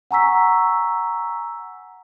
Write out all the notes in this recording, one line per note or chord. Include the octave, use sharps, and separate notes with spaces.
F#5 G#5 A#5 C#6 E6 B6